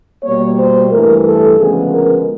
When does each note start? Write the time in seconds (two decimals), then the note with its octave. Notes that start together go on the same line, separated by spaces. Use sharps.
0.24 B2 G3 A#3 C#5
0.57 C5
0.91 G2 E3 A3 A#4
1.24 A4
1.58 D2 C#3 F3 G#3 B3 G#4
1.91 A#4